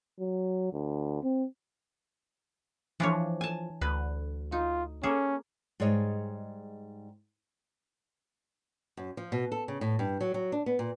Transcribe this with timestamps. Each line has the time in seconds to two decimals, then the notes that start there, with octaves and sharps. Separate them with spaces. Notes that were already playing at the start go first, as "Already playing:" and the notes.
0.19 F#3
0.73 D2
1.23 C4
3.00 E3 F3 D4 C#5
3.41 G#5 A5
3.81 D2 B4
4.52 D#4 F4
5.03 A#3 C#4 G#4 A4
5.80 G#2 G3 G#4 C#5 D#5
8.97 F#2
9.17 F3
9.32 B2
9.52 A4
9.68 C#3
9.81 A2
9.99 G2
10.21 F#3
10.34 F#3
10.52 D4
10.66 B3
10.79 A#2